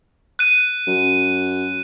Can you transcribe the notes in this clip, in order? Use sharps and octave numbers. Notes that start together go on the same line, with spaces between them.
F#6 D#7
F#2